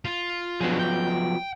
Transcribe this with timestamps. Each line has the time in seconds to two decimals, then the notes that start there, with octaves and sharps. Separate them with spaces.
0.05 F4
0.60 F3 F#3 B3 D4 G#4
0.79 G5